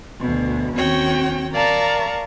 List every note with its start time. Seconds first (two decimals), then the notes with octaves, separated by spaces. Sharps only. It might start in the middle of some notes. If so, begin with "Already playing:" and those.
0.21 D2 B2
0.75 D#2 C4 C#4 F#4 C#5 G5
1.53 A#4 D5 F5 A5 A#5 C#6